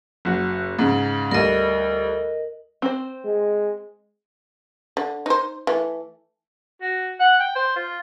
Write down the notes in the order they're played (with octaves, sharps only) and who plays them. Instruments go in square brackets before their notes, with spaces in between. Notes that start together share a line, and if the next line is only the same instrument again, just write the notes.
[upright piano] F#1 F#4
G#2 C#3
[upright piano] D2 G3 [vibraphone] A#4 D#5
[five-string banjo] C4 C5
[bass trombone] G#3
[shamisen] D3
D#4 C5
E3 A3
[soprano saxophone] F#4
F#5
G5
C5
F4